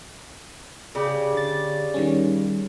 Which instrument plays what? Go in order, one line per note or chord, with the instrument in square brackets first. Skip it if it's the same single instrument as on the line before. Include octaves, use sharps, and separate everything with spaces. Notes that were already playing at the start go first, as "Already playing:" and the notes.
[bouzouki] C#3 G4 D5
[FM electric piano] D3 A6
D#3 G3 C#4